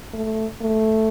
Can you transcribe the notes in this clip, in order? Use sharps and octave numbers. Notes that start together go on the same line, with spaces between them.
A3
A3